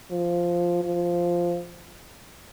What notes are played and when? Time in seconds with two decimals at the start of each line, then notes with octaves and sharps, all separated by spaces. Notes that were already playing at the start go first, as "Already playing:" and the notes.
0.11 F3
0.84 F3